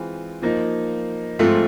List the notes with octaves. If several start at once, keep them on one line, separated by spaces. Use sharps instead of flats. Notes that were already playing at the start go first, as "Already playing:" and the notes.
Already playing: E3 G#3 C4 F4
F3 A#3 D#4
G#2 F3 A3 C4 F4